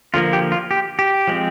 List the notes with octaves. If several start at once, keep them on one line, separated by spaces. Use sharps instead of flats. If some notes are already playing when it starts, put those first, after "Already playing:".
D3 F3 A#3 F4
G4
F4
G4
G4
F3 G#3 C4